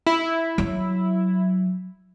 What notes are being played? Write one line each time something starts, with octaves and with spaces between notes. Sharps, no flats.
E4
F#3